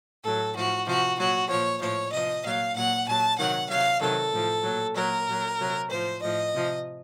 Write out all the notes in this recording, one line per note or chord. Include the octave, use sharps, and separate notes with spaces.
A2 F#3 A4
A2 F3 F#4
C3 F3 F#4
A#2 F#3 F#4
A#2 F3 C#5
A2 F3 C#5
C3 F3 D#5
A#2 F#3 F5
A#2 F#3 F#5
A#2 F#3 A5
C3 D#3 F#3 F#5
C3 F#3 F5
C3 D#3 F#3 A4
A2 F3
A#2 F#3
A#2 F#3 A#4
A#2 F#3
C3 F#3
A2 F3 C5
A2 F3 D#5
C3 F3